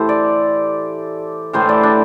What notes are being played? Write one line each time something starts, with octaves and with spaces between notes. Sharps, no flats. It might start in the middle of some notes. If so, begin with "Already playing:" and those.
Already playing: A2 E3 G4 A4 C5
D5
A2 E3 C5
D5
D4